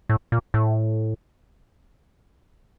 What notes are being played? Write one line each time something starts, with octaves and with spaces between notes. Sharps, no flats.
A2
A#2
A2